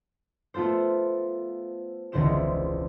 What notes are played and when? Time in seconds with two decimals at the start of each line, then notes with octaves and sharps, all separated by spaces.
0.54 A3 B3 F4 A4 C5
2.12 E1 C#2 D3 E4 C5 E7